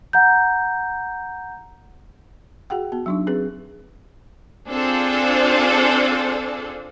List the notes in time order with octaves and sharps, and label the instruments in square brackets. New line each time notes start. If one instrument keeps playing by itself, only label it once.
[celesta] F#5 A#5 G6
[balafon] F#4 G#4 F#5 G5
B3 F#4
F#3 D4 D#4
C4 G#4 B4
[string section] C4 D4 F4 G#4 A4 C5